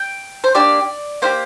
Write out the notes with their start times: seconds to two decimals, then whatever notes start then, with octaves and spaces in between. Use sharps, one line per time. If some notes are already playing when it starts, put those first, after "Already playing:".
Already playing: G5
0.44 C5
0.55 A#3 D4 G4 D5
1.22 A#3 E4 G4 C5